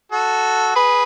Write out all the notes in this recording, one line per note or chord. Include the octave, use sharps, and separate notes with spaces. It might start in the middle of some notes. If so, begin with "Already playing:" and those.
F#4 A4
G#4 B4